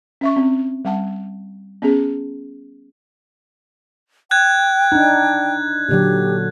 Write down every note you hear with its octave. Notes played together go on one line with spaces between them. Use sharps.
C#4 E5 C#6
C4
G3 F#5 A5
B3 C#4 G#4
G5 F#6 G#6
D4 D#4
A#2 D3 F#3 G4